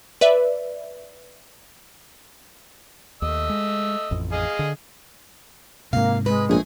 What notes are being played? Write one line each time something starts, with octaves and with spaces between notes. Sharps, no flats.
B4 D5 E5
D#2 A3 D#5 E6
G#3
A1 F2
G#4 D#5 F5
D3
G#2 C3 A#3 F5
G#3 B4
A#1 A3 G#4 G#5